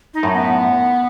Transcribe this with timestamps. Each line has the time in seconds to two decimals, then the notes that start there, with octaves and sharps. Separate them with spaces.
0.14 D#4
0.23 F#2 A2
0.33 B3